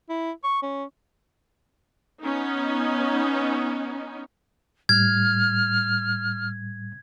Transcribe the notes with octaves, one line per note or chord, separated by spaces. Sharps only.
E4
C#6
C#4
B3 C#4 D#4
A2 G3 F6 G#6